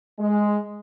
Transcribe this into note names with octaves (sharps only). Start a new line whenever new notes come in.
G#3